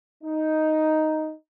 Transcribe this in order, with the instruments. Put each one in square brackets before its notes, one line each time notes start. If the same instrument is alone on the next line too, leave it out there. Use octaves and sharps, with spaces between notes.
[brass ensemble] D#4